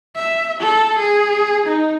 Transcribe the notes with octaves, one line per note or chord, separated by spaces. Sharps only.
E5
A4
G#4
D#4